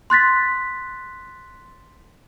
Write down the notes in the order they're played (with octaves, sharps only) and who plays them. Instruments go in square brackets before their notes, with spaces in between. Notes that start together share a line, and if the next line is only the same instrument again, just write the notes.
[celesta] C6 F#6 A6 B6